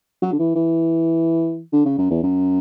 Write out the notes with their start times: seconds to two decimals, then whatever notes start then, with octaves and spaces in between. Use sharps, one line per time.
0.22 F#3
0.32 D3
0.39 E3
0.55 E3
1.73 D3
1.85 C#3
1.98 F#2
2.10 E2
2.23 F#2